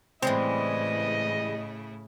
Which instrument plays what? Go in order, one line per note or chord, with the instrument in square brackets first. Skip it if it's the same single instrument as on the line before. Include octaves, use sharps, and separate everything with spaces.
[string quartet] A2 C#3 E4 [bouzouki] E3 G3 G#3 [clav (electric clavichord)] C4 [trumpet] D#5